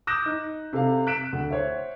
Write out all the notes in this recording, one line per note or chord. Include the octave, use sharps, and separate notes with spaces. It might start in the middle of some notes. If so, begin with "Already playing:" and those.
D6 D#6 F#6 G6 A#6 E7
D#4
C3 A4 F5
F#6 B6 D7 E7
D2
C5 C#5 E5